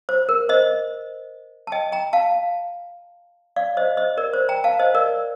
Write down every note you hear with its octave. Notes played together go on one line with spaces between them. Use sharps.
C5
A#4
C5 D#5
A5
D#5 G5
G5 A#5
F5 A5
D5 F5
C5 D#5
C5 D#5
A#4 D5
C5
G5 A#5
F5 A5
C5 D#5
A#4 D5